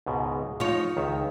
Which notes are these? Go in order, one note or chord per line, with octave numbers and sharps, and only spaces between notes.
C#2 G#2 B2
F3 D#4 F4 C#5
C#2 D#3 E5